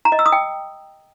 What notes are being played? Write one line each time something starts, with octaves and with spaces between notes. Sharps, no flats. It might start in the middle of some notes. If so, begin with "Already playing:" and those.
A#5
D#5
E6
D#6
G5